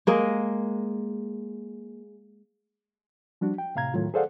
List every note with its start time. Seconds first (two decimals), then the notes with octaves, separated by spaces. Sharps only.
0.07 G#3 A#3 D#5
3.41 F3 G3 D4 F#4
3.58 G5
3.75 A2 C3 F5 A#5 G#6
3.94 A2 D#3 F#3 F4
4.14 G#4 A4 C5 D5 F5 F#5